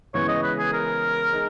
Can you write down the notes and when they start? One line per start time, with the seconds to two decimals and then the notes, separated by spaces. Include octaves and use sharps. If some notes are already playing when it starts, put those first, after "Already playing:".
0.14 C#3 E3 G#3 B3 C#5
0.28 D#5
0.43 B4
0.58 G#4
0.73 A#4
1.32 G#3 D#4 G#4